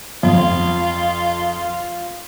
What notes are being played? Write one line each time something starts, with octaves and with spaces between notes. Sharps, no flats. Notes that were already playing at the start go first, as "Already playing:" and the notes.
F2 F4